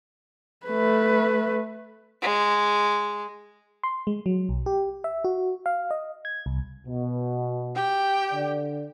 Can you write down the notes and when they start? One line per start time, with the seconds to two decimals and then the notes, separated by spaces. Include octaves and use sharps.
0.67 A3 B4
2.22 G#3
3.83 C6
4.07 G#3
4.26 F#3
4.49 B1
4.66 G4
5.04 E5
5.24 F#4
5.66 F5
5.91 D#5
6.25 G#6
6.46 C2
6.87 B2
7.75 G4 G5
8.32 D3 D5